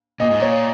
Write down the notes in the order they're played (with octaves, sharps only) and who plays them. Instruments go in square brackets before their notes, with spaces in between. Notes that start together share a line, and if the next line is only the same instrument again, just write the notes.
[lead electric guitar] A#2 [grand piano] D#5
[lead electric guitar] G#2
[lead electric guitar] A#2 [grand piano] C#5